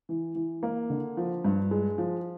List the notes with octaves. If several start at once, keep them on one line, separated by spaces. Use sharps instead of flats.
E3
E3
A#3
D3
F3
G2
G#3
F3